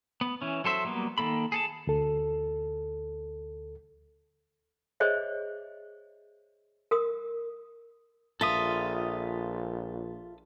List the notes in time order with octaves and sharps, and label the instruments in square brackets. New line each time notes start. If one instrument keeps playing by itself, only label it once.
[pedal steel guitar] B3
E3 C#4
F#3 A4 C5 E5
F#3 G3 A#3 B3
D#3 A#3 A4 B5
G#4 A4 A5
[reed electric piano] D2 A4
[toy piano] G#4 C5 C#5 D#5 E5
A#4 D#6
[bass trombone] A#1 [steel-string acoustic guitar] F4 [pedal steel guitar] A4 E5 D#6